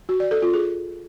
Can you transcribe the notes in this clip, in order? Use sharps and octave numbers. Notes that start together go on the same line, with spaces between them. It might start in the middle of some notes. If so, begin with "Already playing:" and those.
F#4
D5
A4
F4
G#4